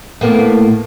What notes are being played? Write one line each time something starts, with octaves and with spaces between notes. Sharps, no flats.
A2 A#3 B3